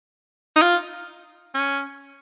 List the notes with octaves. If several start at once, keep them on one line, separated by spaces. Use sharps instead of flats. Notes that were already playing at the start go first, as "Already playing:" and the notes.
D#4
F4
C#4